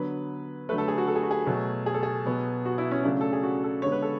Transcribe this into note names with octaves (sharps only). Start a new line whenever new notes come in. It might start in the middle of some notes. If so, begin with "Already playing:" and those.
Already playing: D3 F#3 B3 B4
D3 F#3 A3 B4
A4
G#4
F#4
A4
G#4
F#4
G#4
B2 F#3 A3
G#4
A4
G#4
B2 F#3 B3
F#4
E4
C#4
C#3 F#3 A3 D4
A4
G#4
F#4
A4
D3 G#3 B3 C#5
B4
A4